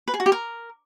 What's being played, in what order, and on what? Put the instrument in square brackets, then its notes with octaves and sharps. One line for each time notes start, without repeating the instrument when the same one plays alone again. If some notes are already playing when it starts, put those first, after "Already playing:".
[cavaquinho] B4
G#4
F#4
G4
A#4